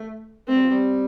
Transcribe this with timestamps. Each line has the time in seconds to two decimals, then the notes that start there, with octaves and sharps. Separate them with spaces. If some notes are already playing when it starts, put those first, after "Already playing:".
Already playing: A3
0.48 A3 C4
0.55 G3
0.62 F3
0.70 G3